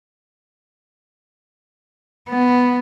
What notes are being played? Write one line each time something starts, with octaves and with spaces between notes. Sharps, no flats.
B3